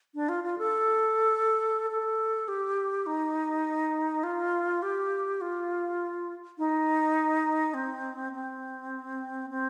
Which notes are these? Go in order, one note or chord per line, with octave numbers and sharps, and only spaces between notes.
D4
F4
F4
A4
A4
G4
D#4
F4
G4
F4
D#4
C4
C4
C4